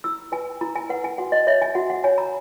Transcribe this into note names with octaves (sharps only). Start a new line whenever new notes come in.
E4 E6
B4 G#5
E4 A#5
G#5
B4 F#5
G#5
F#4 F#5
D#5
C#5 E5
G#5
F#4 F#5
F#5
C#5 G#5
A#5